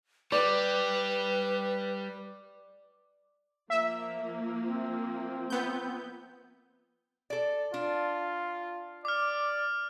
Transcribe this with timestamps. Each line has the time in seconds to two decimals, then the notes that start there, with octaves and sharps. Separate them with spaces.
0.32 G3 B4 D5
3.70 F3 A#3 E5
4.63 C4
5.50 B3 G6
7.30 A4 D5
7.74 D4 F4
9.05 D5 D6 F6